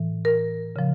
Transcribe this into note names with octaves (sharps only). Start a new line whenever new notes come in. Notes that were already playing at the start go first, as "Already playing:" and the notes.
Already playing: A2 E3
A#4
C#3 F3